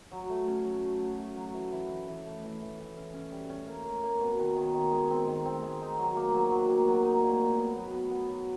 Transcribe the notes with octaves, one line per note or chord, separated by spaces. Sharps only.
F#3
A3
C#4
F#3
A3
F#3
A3
F#3
E3
E3
E3
E3
A3
E3
E3
E3
C#4
C#4
G3
C#4
A#3
A#3
A#3
B2
D#3
D#3
D#3
G#3
C4
D#3
C4
G#3
D#4
F#3
A#3
F#3
F#3
A#3
F#3
D#4
A#2
A#2
B3
F#3
B3
B3
F#3